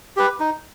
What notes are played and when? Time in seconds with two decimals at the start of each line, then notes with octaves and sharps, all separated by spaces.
0.17 G4 B4
0.40 D#4